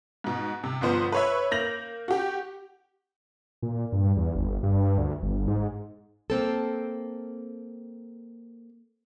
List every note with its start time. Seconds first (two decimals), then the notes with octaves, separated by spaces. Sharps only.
0.24 G#2 B2
0.64 C3
0.81 G1 F3 B3 C5
1.12 B4 C#5 E5
1.51 A#3 G6 A#6 F7 F#7
2.08 F#4 G4
3.62 A#2
3.92 G2
4.17 E2
4.35 G1
4.63 G2
4.98 D2
5.22 G1
5.48 G#2
6.30 A#3 C4 A4